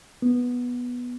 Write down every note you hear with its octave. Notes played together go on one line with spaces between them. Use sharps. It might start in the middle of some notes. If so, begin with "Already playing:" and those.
B3